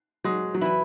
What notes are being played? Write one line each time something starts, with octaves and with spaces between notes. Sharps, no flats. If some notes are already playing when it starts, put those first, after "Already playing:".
F#3 G#3
F#3
E3 E4 B4